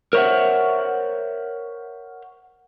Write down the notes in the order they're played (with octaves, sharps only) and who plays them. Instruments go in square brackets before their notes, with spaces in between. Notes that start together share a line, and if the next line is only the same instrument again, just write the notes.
[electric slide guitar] A#4 C5 C#5 D#5 E5 F#5